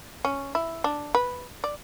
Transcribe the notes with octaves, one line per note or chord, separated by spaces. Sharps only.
C#4
E4
D4
B4
D5